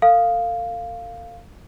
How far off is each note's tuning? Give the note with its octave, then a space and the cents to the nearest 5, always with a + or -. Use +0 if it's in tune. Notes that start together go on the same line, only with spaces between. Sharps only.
A4 +45 F5 +0